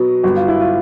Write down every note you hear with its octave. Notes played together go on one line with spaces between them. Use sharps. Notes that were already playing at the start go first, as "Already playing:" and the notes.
Already playing: B2 F#3
G1 F#4
F4
E4
F4